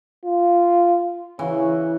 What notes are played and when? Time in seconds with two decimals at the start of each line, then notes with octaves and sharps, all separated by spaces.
0.25 F4
1.39 C#3 E3 F#4